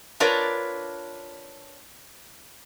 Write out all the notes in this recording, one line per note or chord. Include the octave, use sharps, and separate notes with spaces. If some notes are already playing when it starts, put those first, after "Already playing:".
D4 F4 A#4 B4 C#5 D5